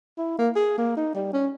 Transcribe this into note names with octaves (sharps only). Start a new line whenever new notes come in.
E4
A#3
G#4
A#3
D#4
G3
C#4